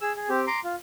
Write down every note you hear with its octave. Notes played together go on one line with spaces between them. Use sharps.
G#4 E6
G#4
C4 G4
A#5 C6 D6
F4